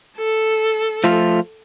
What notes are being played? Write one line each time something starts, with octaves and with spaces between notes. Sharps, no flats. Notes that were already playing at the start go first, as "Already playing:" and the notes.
A4
F3 A3 F4